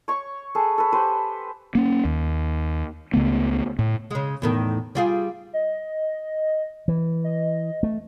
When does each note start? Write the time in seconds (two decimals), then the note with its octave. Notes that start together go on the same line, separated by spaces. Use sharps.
0.08 C#5 C#6
0.55 G#4 A4 B4 C#6
0.78 A4 B4
0.92 G4 B4 C5
1.75 A#3 C#4
2.05 D#2
3.13 C#2 C#3 A3 B3
3.79 A2
4.11 C#3 G#3
4.42 E2 A2 D#3
4.95 G3 F4 G#4
5.53 D#5
6.88 E3
7.24 D#5
7.83 A3